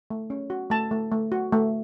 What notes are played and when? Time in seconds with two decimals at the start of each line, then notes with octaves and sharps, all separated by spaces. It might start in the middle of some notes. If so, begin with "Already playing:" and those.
0.10 A3
0.30 C#4
0.50 F#4
0.70 A3 A5
0.91 A3
1.12 A3
1.32 F#4
1.52 A3